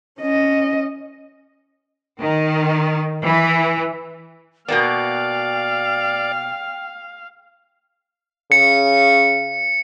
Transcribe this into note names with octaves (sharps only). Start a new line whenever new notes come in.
C#4 D#5
D#3
E3
B2 A#3 B3 D5 F5 G5
C#3 C#7